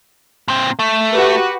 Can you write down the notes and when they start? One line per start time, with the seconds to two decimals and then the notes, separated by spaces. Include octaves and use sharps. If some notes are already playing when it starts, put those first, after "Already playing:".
0.48 A#2 C4
0.79 A3
1.12 F#4 G4 B4